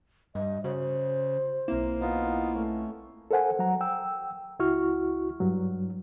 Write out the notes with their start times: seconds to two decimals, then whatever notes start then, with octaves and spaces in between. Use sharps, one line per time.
0.35 G2 G3 D#5
0.64 C#3 F#4 C5 C#5
1.68 B1 A#3 C4 E4
2.01 B3 D#4 F4
2.54 A3 C#4
3.31 A4 A#4 C5 F#5 G#5
3.59 F#3 F#5 A#5
3.81 G5 E6
4.59 C#2 E4 F#4 C#6 F6
5.40 G2 F#3